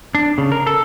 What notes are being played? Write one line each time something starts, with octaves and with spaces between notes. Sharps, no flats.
D4
C#3
A#4
A4